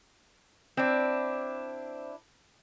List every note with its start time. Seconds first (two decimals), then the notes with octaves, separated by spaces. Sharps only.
0.77 C4 D4 E4